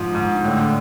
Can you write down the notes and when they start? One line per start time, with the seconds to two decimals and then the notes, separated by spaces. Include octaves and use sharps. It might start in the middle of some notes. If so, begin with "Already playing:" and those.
Already playing: G#2 F3
0.15 G#2
0.43 A2 D3